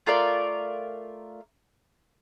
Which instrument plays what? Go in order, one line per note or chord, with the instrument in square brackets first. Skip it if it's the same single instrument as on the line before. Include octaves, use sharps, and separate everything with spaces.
[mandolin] A3 F4 A#4 D5